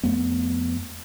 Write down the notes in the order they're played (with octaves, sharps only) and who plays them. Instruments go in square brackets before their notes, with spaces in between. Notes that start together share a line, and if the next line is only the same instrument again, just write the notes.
[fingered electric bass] F2 A3 B3